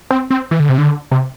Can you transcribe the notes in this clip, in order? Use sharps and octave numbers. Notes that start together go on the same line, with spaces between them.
C4
C4
E3
D3
C3
D3
C3